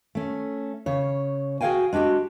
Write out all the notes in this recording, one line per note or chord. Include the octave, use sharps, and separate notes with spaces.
A3 C#4
C#3 C#5
F#4 G#4 C#5 F5 G5 G#5
G#3 D4 F#4 G4